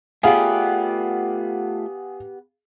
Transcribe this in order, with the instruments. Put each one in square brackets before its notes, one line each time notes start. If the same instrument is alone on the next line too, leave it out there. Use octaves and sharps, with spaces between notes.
[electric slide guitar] A3 F4 D5 [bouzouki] B3 G4 [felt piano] G#4 F5